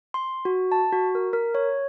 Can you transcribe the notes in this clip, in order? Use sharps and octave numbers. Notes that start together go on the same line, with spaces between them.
C6
F#4
A5
F#4
A#4
A#4
C#5